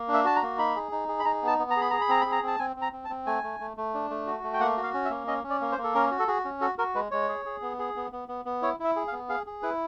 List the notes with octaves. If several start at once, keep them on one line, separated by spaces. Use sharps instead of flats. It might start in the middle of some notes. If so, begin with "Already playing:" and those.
Already playing: A#3
D4
E5
F#4 A5
A#5
A#3
D#4 B5
G#4
D#4
G#4
B5
D#4 A#5
B3 A5
B3
A#5
G#4 B5
G#4 A#5
B5
C4 A#5
B5
G#4
A#5
C4 A5
C4 G#5
C4
A#5
C4
A5
C4
A3 G#5
A3
A3
A3
D4
A3
F#4
A3
G5
A#3 F#5
F#4
F5
C#4
E5
A#3
C#4 D#5
C#4
D5
A#3
C5
A#3
A4
C#4 A#4
F#4
A4
F#4 G#4
C#4
F#4 A4
F#4 A#4
G#3 B4
G#3 C#5
G#4
G#4
B3
G#4
B3
B3
B3
B3
E4 C#5
E4 E5
G#4
F5
B3
G#4 F5
G#4
E4 B4